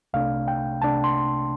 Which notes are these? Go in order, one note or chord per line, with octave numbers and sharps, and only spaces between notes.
C2 C3 A3 D4 F5
G5
C2 C3 A3 D4 A5
C6